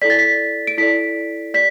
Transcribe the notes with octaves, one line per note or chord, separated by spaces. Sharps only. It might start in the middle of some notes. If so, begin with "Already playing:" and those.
E4 A4 D5 B6
A6
B6
D7
E4 A4 D5 B6
G4 D5 B6